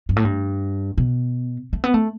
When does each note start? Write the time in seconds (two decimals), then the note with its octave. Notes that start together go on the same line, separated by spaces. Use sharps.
0.09 G2
0.16 A2
0.25 G2
0.98 B2
1.73 A3
1.84 B3
1.94 A3